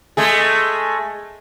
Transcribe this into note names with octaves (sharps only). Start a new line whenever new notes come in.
G#3 A3 G#4